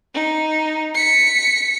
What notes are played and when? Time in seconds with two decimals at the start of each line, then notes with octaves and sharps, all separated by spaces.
0.14 D#4
0.94 B6 C#7